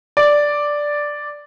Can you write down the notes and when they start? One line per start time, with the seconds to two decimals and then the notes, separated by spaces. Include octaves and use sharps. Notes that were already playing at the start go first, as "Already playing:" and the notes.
0.17 D5